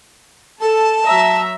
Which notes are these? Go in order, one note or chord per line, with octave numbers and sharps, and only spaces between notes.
A4 A5
F#3 E5 A#5